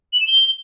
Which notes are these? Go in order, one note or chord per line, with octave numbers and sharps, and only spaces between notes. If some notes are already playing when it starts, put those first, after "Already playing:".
F#7
E7
G7